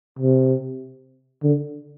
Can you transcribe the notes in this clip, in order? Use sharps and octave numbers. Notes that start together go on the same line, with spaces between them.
C3
D3